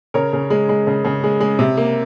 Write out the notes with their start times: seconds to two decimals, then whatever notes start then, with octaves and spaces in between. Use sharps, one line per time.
0.14 C#3 A#4 C#5
0.33 C#3
0.50 G#3
0.69 G#3
0.87 C#3
1.05 C#3
1.24 G#3
1.41 G#3
1.59 C3
1.77 A#3